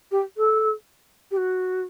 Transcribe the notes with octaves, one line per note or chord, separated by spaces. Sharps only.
G4
A4
G4
F#4